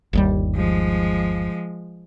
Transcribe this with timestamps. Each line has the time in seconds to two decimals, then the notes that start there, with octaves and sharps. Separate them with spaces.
0.13 G1 D#2 G3
0.56 F3 G#3